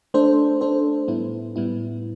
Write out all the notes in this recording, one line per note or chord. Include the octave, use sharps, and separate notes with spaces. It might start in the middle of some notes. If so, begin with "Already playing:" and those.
A3 D4 A4 C5
A3 D4 A4 C5
A2 G3 B3 E4
A2 G3 B3 E4